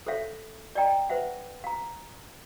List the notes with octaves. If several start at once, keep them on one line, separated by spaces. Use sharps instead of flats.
A4 C5 C#5 E5 F5
D5 D#5 G5 A#5
B4 C5 E5 F#5
F5 A#5